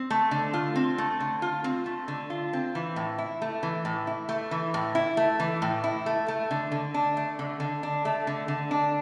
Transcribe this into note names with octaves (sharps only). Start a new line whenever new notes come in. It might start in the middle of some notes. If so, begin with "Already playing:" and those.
Already playing: C4
A3
D3
F4
C4
A3
D3
F4
C4
A3
D3
F4
C4
E3
A2
E4
A3
E3
A2
E4
A3
E3
A2
E4
A3
E3
A2
E4
A3
A3
D3
D3
D4
A3
D3
D3
D4
A3
D3
D3
D4